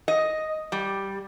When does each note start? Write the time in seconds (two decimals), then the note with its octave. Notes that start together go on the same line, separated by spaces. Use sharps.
0.08 D#5
0.72 G3